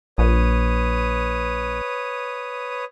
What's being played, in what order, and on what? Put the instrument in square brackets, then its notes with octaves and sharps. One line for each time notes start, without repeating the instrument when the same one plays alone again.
[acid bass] A#1 [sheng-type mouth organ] B4 C#5 D#6